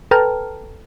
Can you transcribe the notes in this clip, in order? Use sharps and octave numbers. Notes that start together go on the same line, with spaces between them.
A4 B4 G5 A5 A#5 F6